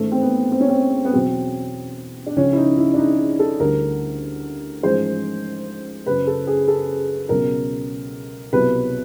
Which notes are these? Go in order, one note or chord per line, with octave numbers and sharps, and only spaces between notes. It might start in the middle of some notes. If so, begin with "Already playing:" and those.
Already playing: A1 G#2 D#3 A3
C4
B3
C4
C#4
C4
B3
E2 B2 F#3 C4
D4
C#2 C#3 F3 C#4
E4
D#4
E4
D4
D#4
A4
D2 D3 G3 A#4
A1 G#2 F3 G#3 C5
F#1 F#2 C#3 F#3 B4
A4
G#4
A4
C#2 B2 F#3 A#4
C2 B2 F#3 B4